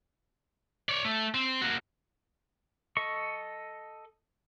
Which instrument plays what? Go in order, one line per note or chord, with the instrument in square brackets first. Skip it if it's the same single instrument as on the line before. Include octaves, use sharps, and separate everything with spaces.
[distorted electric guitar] C#5 D5
A3
C4
A#3 F#4
[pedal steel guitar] A4 D#5 C#6